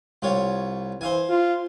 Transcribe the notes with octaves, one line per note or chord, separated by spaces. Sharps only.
C2 F4 C#5
E3 C5 F5 G#5
F4